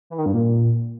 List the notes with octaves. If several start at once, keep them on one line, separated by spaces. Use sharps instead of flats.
E3
D#3
G2
A#2